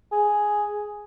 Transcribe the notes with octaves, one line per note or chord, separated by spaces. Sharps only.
G#4